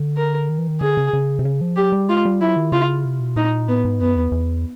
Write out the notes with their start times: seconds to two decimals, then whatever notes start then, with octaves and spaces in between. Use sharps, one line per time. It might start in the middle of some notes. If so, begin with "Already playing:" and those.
Already playing: D3
0.17 A#4
0.49 D#3
0.58 E3
0.68 D#3
0.81 D3 G#4
0.97 C#3
1.13 C#3
1.39 C3
1.45 C#3
1.61 F3
1.76 F#3 G4
1.92 G3
2.09 G#3 F4
2.25 G3
2.41 F#3 E4
2.56 D#3
2.72 C#3 F4
3.05 C3
3.20 B2
3.36 A#2 D#4
3.68 A2 B3
3.85 G#2
4.00 F#2 B3
4.16 E2
4.32 E2